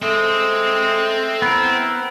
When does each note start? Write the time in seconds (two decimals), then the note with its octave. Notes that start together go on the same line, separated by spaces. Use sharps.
0.02 G#3 A3 C4 C5
1.42 B3 E4 A#4